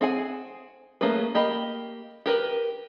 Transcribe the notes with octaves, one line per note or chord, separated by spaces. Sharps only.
C4 G#4 F#5 G#5
A3 A#3 C#4 G#4 B4
A#3 G4 D#5 B5
G4 A#4 B4